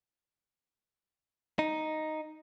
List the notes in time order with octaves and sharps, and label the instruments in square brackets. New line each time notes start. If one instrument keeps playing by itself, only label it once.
[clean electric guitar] D#4